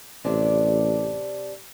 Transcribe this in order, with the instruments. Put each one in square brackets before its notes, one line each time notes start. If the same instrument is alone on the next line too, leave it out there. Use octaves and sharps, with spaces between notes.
[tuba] A1 [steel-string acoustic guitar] C3 D4